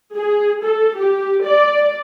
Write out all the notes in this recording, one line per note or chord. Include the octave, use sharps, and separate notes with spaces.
G#4
A4
G4
D5